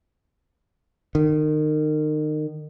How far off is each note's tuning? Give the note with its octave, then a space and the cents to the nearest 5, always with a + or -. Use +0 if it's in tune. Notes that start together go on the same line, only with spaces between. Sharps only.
D#3 -30